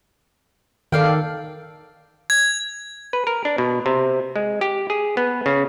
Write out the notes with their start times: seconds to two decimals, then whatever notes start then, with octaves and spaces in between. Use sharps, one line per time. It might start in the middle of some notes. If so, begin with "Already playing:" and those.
0.92 D#3 A4 D5 F5 G5
2.30 G#6
3.13 B4
3.27 A#4
3.45 D4
3.58 B2
3.86 C3
4.36 G#3
4.61 G4
4.90 G#4
5.17 B3
5.46 C#3